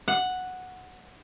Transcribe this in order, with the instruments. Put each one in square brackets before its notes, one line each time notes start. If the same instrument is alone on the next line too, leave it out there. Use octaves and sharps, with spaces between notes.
[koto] F#5